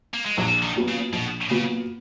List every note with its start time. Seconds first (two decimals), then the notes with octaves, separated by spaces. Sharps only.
0.14 A#3
0.26 G#3
0.37 A#1 F#3
0.63 D#3
0.76 A#2 F#3 B3
0.88 C#3
1.13 A#1 B2
1.50 A#2 C#3 F#3 B3